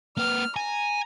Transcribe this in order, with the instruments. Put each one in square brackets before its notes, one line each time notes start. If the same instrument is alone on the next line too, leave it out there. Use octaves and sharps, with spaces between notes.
[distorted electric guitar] A#3 B4 [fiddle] F6
[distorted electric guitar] G#5 [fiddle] A#5